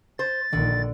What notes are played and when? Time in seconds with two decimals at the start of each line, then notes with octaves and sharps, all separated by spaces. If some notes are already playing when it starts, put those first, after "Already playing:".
0.19 C5 A6
0.53 A#1 D3 D#3